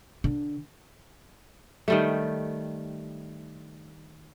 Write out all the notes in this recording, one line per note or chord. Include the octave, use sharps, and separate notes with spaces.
D3
D#3 G3 A3